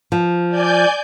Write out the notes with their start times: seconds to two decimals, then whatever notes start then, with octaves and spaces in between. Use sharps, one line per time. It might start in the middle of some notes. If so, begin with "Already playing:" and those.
0.12 F3
0.48 D5 G#5 G6